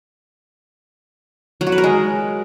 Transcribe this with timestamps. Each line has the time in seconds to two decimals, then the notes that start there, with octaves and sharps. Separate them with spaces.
1.61 F#3
1.67 F#4
1.72 B4
1.78 A#4
1.84 G#3